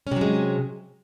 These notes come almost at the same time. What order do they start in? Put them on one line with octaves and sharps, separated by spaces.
C#4 C3 F#3 G#3